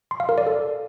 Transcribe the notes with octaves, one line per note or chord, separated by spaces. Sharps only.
C6
F5
A#4
D5
A4